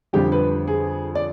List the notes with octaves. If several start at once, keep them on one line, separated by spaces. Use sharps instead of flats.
F2 D3 G3 G4
B4
G#4
D5